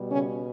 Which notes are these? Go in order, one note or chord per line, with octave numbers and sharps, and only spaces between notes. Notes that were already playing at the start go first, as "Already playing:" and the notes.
Already playing: B2 G3
C#3 C#4